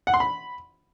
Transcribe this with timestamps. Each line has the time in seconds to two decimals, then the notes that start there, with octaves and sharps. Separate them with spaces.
0.07 F#5
0.14 C6
0.20 B5